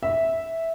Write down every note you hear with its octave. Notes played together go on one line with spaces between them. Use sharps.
E5